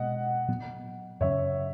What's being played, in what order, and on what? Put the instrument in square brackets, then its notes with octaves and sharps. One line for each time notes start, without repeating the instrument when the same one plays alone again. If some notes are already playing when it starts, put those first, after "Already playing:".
Already playing: [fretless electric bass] B2 G#3 B3 [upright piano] D#5 F#5
[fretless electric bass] A#2 F#3 B3
[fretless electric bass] F#2 C#3 F#3 C#4 [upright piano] C#5 E5